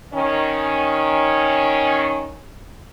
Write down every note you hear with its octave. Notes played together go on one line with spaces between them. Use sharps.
D#3 C#4